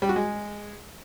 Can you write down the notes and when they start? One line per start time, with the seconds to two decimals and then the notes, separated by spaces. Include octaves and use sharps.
0.02 G3
0.09 F#4
0.16 G#3